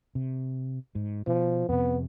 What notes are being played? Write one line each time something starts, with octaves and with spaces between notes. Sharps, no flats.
C3
G#2
B2 F3
F2 C3 B3